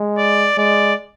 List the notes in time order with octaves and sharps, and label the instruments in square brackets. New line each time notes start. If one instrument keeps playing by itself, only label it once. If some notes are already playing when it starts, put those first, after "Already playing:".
Already playing: [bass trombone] G#3
[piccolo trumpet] D5
[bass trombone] G#3 [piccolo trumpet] D5